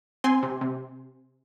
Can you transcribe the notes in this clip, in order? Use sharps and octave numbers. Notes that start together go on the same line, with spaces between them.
C4 G#5 C6
C3
C3